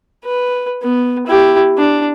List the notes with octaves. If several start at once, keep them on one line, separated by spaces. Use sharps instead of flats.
B4
B3
E4 G4
D4